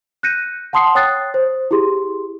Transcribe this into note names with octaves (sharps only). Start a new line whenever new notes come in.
F#6 G6 A#6 C#7 D#7
F#5 A5 C6 D#6 C7 C#7
C#5 G5 D#6 F#6 A6 C7
C5
E4 G4 G#4 C6